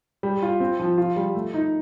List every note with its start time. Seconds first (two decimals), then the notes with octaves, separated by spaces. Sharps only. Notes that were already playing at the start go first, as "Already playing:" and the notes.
0.23 G3
0.43 F4
0.60 C4
0.79 F3
0.98 F4
1.16 G3
1.35 A3
1.54 D#4